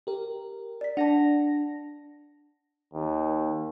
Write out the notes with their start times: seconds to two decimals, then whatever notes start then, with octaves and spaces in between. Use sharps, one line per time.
0.07 G4 A#4
0.81 D5 B6
0.97 D4 F#5 A5 A#6
2.94 D#2